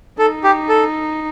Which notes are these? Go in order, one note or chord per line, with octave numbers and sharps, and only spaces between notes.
D#4 A4
G4
A4